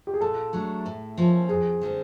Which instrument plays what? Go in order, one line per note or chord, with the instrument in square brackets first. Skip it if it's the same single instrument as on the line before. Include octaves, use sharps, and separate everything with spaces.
[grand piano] G4
G#4
[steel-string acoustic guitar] A#2 [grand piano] A4
[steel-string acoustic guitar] F#3 A3 D4
A2
F3 A#3 C#4
[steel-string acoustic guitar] F2 [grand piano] G#4
[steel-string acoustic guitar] D3 G3 C4